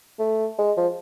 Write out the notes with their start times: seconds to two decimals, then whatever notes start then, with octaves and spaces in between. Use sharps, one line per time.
0.19 A3
0.58 G#3
0.77 F3